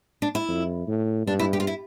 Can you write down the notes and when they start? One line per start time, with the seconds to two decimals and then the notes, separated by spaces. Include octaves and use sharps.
0.22 D4
0.35 E4
0.49 F2
0.88 A2
1.27 G2 D4
1.39 E4
1.53 G4
1.60 F4
1.67 E4